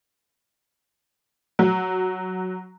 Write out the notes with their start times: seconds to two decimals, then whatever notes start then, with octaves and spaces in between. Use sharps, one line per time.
1.59 F#3